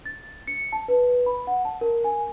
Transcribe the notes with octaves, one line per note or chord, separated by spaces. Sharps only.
A6
C#7
A5
B4
B5
F#5
A5
A#4
G#5